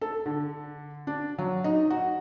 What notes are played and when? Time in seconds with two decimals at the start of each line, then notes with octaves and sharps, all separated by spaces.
0.01 A4
0.26 D3
1.07 D4
1.38 F#3
1.64 D#4
1.90 F#4